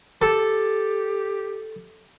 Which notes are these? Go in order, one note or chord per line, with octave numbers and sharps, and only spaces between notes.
G4 A4